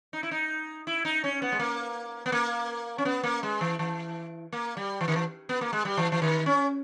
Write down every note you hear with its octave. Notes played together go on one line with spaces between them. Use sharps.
D#4
E4
D#4
E4
D#4
C#4
B3
G#3
A#3
B3
A#3
C#4
B3
A#3
G#3
E3
E3
A#3
G3
E3
D#3
E3
B3
A#3
G#3
G3
E3
E3
D#3
C#4